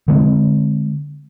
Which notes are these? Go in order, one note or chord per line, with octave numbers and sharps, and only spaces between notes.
D3 G#3 C4